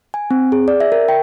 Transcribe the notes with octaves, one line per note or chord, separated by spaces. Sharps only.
G#5
C4
G#4
D5
E5
A#4
G5